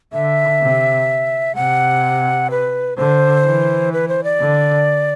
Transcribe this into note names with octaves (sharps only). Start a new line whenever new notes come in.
D3 E5
C3
C3 F#5
B4
D3 C5
E3
B4
C5
D5
D3